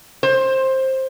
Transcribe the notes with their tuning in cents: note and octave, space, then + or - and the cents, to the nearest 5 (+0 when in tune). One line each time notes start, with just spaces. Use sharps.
C5 +15